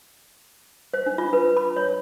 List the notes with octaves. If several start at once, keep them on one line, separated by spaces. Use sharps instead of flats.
C5
D4
F4
B4
B5
C#5